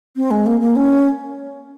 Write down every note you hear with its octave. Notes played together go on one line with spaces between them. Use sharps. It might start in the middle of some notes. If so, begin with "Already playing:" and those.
C4
G#3
A#3
A#3
C#4